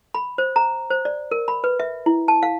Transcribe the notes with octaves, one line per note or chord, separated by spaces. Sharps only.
B5
C5
A#5
C5
D5
A#4
B5
B4
E5
E4
A5
F5